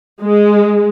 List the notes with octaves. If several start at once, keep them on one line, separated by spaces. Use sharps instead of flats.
G#3